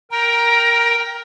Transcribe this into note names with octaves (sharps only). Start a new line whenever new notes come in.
A#4 G5 A#5